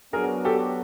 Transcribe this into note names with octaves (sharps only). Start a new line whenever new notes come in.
F#3 B3 D4 F#4 G#4 A#4
G4 A4